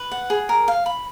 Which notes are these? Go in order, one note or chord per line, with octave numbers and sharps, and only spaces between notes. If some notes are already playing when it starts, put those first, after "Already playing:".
Already playing: B4
F#5
G#4
A#4
F5
B5